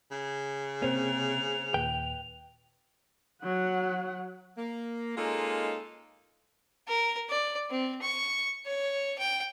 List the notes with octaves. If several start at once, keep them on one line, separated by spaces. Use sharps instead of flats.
C#3
C3 A#3 C4 C#4 C5 F7
D#2 A#2 B4 G5
F#3 F#5
A#3
G#3 A#3 C#4 D#4 F4 A4
A#4
D5
C4
C#6
C#5
G5